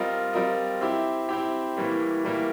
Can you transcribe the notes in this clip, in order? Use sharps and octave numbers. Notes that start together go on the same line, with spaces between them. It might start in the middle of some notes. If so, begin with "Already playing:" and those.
Already playing: G3 C4 F4 A#4 D#5
G3 C4 F4 A#4 D#5
C4 E4 G4
C4 E4 G4
A2 E3 G3 A#3
A2 E3 G3 A#3